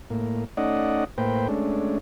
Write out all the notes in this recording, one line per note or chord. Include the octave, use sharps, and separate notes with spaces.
A2 A#3
A3 C#4 D#4 D5 D#5 F#5
A2 A#3 B4 C5 G5
G#3 A3 C#4 D4